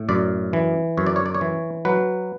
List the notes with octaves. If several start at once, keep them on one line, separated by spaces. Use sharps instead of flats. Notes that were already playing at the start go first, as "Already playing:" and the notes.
Already playing: A2
F#2 D5
E3
F#2 C#5
D5
C#5
D5
C#5
E3
F#3 B4